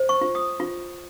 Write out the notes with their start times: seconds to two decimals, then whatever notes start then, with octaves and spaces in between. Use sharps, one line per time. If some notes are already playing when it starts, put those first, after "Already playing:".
Already playing: C5
0.09 C#6
0.21 F4
0.35 D#6
0.60 F4